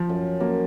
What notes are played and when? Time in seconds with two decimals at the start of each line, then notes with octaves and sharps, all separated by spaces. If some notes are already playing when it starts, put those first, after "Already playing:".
Already playing: F3
0.09 F#2
0.40 F#2 A#3